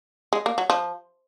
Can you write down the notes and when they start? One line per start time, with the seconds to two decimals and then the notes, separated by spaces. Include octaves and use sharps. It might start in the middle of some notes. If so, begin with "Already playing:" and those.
0.33 G#3
0.46 A#3
0.58 F#3
0.70 F3